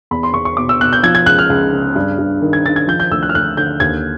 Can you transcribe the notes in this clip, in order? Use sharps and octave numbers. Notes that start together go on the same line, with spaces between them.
E2 B5
C6
E2 C#6
C#6
B2 D6
E6
B2 F#6
G6
F3 G#6
G#6
C#2 F#6
F6
C#2
C#3
G2
G2
D#3
G#6
D#3 A6
G#6
F3 G6
G6
D2 E6
F#6
F6
D2 F#6
D3 G6
D#2 G#6